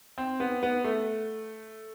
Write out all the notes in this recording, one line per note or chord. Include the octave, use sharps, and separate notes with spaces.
C4
B3
B3
A3